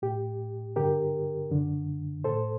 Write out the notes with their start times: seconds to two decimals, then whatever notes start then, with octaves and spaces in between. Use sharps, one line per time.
0.02 A2 G4
0.76 G2 D3 G4 A#4
1.50 F#2 D3
2.24 A2 A4 C5